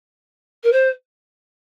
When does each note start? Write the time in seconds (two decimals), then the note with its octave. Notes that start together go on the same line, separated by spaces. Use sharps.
0.64 A#4
0.72 C5